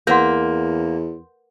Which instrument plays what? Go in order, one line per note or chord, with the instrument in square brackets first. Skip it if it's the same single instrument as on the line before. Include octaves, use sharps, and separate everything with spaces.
[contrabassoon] E2 [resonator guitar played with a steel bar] A#3 [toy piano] A#4 B4 F#5 [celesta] C6 G6